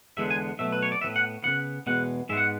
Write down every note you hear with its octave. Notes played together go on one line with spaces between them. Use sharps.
E2 D3 G#3 B3 E5
G#5
B2 F#3 A3 E5
B4
C#5
D5
A2 F#3 B3 E5
F#5
C#3 E3 B3 F#5
E2 B2 G#3 B3 F#5
G#2 G#3 B3 E5
F#5